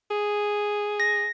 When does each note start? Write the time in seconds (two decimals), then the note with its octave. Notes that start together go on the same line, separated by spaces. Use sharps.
0.11 G#4
1.00 A#6